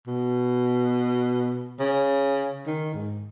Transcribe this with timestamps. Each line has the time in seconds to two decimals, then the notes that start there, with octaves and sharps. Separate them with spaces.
0.07 B2
1.80 C#3
2.66 D#3
2.94 G#2